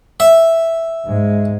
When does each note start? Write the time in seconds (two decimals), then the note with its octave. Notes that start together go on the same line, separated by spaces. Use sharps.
0.20 E5
1.05 G#2 G#3